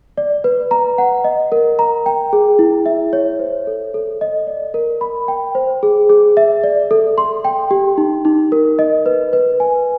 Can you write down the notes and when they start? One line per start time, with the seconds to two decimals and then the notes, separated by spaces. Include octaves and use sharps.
0.18 D5
0.44 B4
0.71 A#5
0.98 F#5
1.24 D#5
1.52 A#4
1.79 A#5
2.06 G5
2.33 G#4
2.59 E4
2.86 E5
3.13 C#5
3.39 C5
3.67 A4
3.94 A4
4.21 D#5
4.47 D5
4.74 A#4
5.01 B5
5.28 G5
5.55 C5
5.83 G#4
6.10 G#4
6.37 E5
6.64 D5
6.91 A4
7.18 C6
7.45 G5
7.71 G4
7.98 D#4
8.25 D#4
8.52 A#4
8.79 D#5
9.06 B4
9.33 B4
9.60 G#5